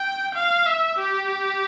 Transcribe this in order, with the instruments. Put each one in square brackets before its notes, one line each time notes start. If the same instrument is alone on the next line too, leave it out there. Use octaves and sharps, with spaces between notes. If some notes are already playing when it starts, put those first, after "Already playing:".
Already playing: [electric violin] G5
F5
E5
G4